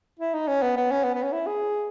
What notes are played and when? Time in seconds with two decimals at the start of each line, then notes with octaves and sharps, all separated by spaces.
0.19 E4
0.34 D#4
0.48 C#4
0.62 B3
0.77 B3
0.91 C#4
1.04 B3
1.14 B3
1.23 C#4
1.33 E4
1.46 G#4